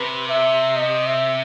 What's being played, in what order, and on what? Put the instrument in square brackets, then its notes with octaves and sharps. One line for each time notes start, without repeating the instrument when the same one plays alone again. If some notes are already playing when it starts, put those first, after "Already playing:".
Already playing: [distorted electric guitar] C3 [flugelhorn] B4
[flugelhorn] E5
D#5
E5